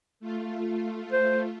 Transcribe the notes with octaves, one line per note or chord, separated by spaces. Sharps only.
A3 F4
C5